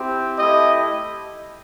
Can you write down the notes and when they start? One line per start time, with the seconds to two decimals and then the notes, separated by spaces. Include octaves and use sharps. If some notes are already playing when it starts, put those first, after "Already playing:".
Already playing: C4 E4 G4
0.39 A3 E4 G4 D#5